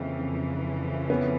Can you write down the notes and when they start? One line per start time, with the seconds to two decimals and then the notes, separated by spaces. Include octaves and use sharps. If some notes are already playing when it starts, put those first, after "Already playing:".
Already playing: F2 C#3 E3 A#3 C4
1.09 B3 C#4